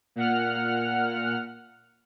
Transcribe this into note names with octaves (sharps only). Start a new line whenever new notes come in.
A#2 F#5 F6